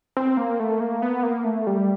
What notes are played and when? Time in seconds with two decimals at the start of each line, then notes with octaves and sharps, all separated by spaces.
0.17 C4
0.37 A#3
0.60 A3
0.80 A#3
1.02 B3
1.23 A#3
1.45 A3
1.67 G3